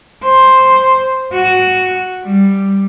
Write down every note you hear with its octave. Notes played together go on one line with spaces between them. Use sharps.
C5
F#4
G3